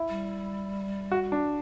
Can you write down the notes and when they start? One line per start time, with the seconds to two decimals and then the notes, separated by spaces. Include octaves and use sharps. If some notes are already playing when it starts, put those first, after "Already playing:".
Already playing: E4
0.09 G3
1.11 F#4
1.32 D4